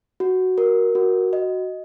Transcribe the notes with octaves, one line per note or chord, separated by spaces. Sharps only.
F#4
A#4
F#4
D#5